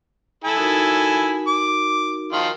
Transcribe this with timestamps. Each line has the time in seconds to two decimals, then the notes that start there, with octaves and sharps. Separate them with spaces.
0.44 E4 A4 G#5
0.57 D#4 F#4 A#4
1.47 D6
2.33 D#3 F3 F4